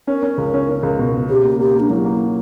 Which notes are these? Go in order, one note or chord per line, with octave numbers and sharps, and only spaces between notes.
C#4 A#4
C#4
C#2
C#4
C#4
C#2
B2
B2
C#3 G4
A#3
A#3 G4
A#3 D4
F#3 E4
A#3